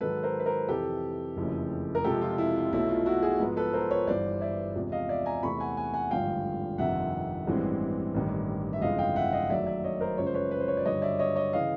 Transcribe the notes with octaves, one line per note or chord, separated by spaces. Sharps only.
G#2 D#3 F#3 A4 B4
A#4 C5
B4
A#4 C5
F2 C3 E3 G4 A4
F#1 F2 C#3 E3 A3
A#4
F2 C3 F3 G#3 G4 A4
F4
E4
F4
B1 B2 F#3 A3 E4
F4
E4 F#4
F#4 G#4
G#2 F3 G#3 B3
A4 B4
A#4 C5
B4 C#5
G1 G2 E3 C5 D5
D5 E5
E2 C3 F3 G#3
D#5 F5
D5 E5
G#5 A#5
E2 C3 E3 A3 C4 B5 C#6
F#5 G#5
F#5 G#5
F#5 G#5
G#1 G2 D3 F3 A3 F5 G5
G1 F2 C3 D#3 E5 F#5
A1 G2 E3 G#3 C4
A1 G2 D#3
E5
G1 F2 C#3 E3 G#3 D#5 F5
F5 G5
E5 F#5
D#5 F5
F#1 F#2 D#3 F#3 A3 D5 E5
D5 E5
C#5 D#5
A#4 C5
F#2 C#3 F3 G#3 C#4 C#5
C5
B4 C#5
B4
C5
C#5
D5
G2 D3 F#3 C#5 D#5
D5 E5
C#5 D#5
C#5 D#5
C#3 E3 D#5 F5